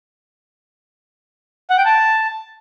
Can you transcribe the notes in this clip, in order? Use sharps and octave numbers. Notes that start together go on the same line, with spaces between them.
F#5
G5
A5